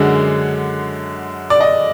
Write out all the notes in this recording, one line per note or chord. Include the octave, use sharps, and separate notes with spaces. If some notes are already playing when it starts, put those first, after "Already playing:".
Already playing: F#2 D3 G#3 F#5
D5
D#5